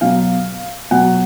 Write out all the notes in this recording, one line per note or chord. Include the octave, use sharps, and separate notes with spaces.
B2 F#3 F5
B2 F#3 F#5